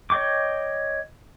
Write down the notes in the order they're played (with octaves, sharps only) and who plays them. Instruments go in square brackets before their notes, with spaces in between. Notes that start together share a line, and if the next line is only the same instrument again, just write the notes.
[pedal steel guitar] C#5 D#5 G5 C#6 D6